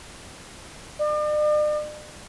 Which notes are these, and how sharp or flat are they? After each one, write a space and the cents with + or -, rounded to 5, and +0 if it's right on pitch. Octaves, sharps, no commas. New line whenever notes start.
D5 +45